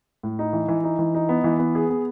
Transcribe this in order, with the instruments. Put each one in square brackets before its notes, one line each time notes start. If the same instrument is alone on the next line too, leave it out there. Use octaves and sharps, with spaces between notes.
[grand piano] A2
D#4
E3
E3
D#4
E3
D#4
B3
E3
B3
G#4
B3